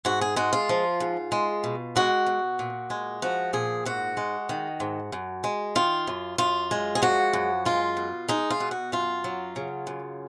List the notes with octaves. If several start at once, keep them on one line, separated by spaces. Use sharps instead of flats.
G#2 F#4
G#4
G#3 F#4
F4
F3
G#2
G#3
B2
G#3 F#4
B2
A#2
G#3
F3 F#4
A#2 G#4
G#2 F#4
G#3
D#3
G#2
F#2
G#3
D#3 F4
F#2
F#2 F4
G#3
G#4
F3 F#4
F#2
G#3 F4
B2
G#3 D#4
F4
B2
F#4
F#2 F4
F#3
C#3
F#2